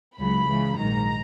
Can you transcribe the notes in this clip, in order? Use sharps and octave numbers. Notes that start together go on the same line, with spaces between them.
C#2 C#3 F#3 B5
C#2 C#3 E3
A#1 G#2 D#3 F#3 A#5